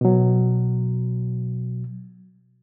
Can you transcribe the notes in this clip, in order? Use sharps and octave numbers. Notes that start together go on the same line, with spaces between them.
B2 F#3